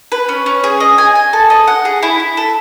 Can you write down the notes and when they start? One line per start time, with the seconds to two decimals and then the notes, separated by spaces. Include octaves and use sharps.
0.12 B4
0.29 C#4
0.46 C#4
0.64 G#4
0.80 D#5
0.98 G#5
1.15 G#5
1.33 A4
1.50 D#5
1.68 F#5
1.85 G#4
2.03 E4
2.20 E4
2.37 A4